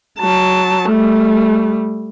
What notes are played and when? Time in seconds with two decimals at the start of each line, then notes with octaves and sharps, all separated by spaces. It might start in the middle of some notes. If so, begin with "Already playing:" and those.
0.19 F#3 A5
0.89 G3 A3